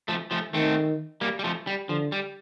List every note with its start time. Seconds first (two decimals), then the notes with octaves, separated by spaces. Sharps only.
0.08 F3 A3
0.31 F3 A3
0.54 D#3 A3 C4
1.21 G3 A#3
1.39 G3
1.44 F3 A3
1.67 G3
1.89 D3 F3
2.12 G3